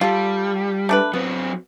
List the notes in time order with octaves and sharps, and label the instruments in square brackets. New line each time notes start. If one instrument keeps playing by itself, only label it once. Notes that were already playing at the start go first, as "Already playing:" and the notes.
[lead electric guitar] G3 [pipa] F4 A4
[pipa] A3 D4 B4
[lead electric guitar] F#3 C4 [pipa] B3